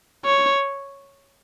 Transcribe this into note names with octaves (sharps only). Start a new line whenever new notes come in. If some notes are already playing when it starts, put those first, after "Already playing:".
C#5